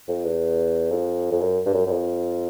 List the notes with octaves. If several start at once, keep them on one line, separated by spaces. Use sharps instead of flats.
F2
E2
F2
F2
F#2
G2
F#2
F#2
F2